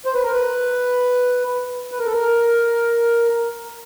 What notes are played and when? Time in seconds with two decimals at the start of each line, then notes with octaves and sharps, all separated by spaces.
0.05 C5
0.14 B4
0.23 A#4
0.32 B4
1.92 B4
1.99 A#4
2.06 A4
2.13 A#4